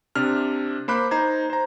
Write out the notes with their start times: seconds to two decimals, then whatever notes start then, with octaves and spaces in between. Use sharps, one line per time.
0.15 C3 D4 F6
0.88 A#3 C5 B5 D6 F#6
1.11 D#4 C5 A#5 G#6
1.50 C5 A#5